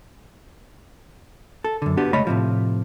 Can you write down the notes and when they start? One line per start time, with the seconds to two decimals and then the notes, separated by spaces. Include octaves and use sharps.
1.64 A4
1.82 F#2 D3
1.97 B3 D4 F#4 G4
2.13 C#2 A3 C#5 D#5 B5
2.27 A2 C3 F3